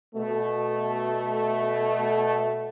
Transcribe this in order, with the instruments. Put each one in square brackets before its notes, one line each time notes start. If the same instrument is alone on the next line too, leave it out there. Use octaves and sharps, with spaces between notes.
[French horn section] B2 A3